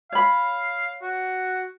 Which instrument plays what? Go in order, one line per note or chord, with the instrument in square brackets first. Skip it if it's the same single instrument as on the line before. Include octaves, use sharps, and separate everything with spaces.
[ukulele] C#5 B5 [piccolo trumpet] F5
[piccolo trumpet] F#4